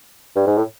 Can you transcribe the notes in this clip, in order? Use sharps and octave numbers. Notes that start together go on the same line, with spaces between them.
G2
G#2
A2